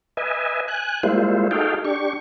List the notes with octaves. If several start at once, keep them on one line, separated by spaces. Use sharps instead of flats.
B4 D#5 E5 G#5
G#5 F#6
G3 G#3 A#3 E4 F4 C5
D#4 F#4 G#4 A4 F5 G5
D4 G4 C#6